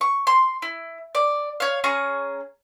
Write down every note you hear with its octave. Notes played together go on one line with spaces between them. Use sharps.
C#6
C6
E4
D5
C#5 F5
C#4 G#4 A#5 C#6